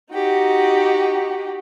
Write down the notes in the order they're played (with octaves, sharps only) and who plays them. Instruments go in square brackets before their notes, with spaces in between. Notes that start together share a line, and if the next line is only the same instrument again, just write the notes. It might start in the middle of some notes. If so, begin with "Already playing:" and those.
[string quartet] D#4 F#4 G4